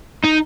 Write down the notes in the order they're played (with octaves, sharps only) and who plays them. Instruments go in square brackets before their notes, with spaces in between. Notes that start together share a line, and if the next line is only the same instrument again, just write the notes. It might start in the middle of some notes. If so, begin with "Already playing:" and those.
[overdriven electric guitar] D#4